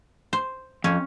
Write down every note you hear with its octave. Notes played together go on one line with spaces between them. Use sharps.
C5
F2 C#4